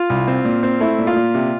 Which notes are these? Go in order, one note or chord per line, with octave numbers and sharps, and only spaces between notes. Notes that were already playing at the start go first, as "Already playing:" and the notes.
Already playing: F4
C2
C4
A#2
C4
A3 E4
A#2
F4
A#2
C3